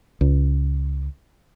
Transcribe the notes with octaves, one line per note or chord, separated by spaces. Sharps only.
C#2